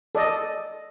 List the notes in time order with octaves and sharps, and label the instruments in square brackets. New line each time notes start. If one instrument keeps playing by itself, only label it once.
[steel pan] A4 D5 D#5